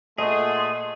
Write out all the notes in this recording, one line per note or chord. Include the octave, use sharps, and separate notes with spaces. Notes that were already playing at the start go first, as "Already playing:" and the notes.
A#2 A3 G#4 D#5 F#5 C6 D#6